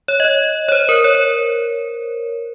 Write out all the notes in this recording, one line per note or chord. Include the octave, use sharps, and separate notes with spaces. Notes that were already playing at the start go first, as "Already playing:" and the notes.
C#5
D#5
C#5
C#5
C5
A#4
C#5
C#5